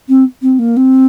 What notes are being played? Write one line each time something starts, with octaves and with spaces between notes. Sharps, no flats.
C4
C4
A#3
C4